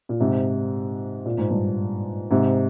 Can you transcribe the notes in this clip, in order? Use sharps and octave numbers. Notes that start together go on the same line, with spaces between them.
A#2
G#2 C3
A#2
G#2
G2 A#2
G#2 C3